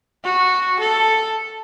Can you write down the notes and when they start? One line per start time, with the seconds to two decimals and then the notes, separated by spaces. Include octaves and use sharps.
0.24 F#4
0.80 A4